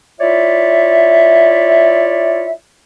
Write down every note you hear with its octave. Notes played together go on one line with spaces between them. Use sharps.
E4 F4 C#5 D5 E5